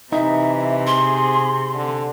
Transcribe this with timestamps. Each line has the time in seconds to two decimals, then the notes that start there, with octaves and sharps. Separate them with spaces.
0.12 C3 E3 D#4 E5
0.87 G#4 C6
1.75 D3